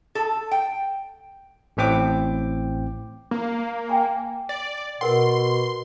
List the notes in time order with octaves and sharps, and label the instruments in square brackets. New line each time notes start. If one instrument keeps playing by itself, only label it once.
[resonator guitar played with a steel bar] A4
G5
[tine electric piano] A1 A2 C4 G5 D6
[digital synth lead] A#3
[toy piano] G5 G#5 A#5
[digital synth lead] D5
[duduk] B2 [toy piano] A#4 B4 F#5 [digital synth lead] C6